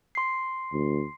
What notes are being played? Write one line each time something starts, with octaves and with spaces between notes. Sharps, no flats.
C6 C7
D2